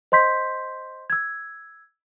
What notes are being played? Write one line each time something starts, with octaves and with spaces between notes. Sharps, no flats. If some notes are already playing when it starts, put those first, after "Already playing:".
C5 D#5 C6 G6 B6
E6 G#6